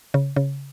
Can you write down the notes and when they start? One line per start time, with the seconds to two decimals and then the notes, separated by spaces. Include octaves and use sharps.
0.14 C#3
0.36 C#3